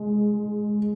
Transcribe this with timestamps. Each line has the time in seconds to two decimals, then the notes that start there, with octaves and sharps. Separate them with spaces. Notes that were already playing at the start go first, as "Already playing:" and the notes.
Already playing: G#3